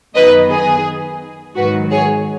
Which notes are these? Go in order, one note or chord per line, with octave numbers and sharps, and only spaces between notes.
F#2 D#3 B3 B4 D#5
G#4
G#2 D#3 F#3 F#4 B4
G#4 C#5